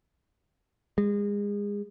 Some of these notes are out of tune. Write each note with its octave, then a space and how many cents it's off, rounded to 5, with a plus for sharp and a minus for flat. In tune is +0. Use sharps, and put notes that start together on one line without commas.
G#3 -30